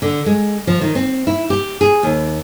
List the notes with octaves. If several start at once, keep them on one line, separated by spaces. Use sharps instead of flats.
D3
G#3
F3
D#3
C4
E4
G4
G#4
D#2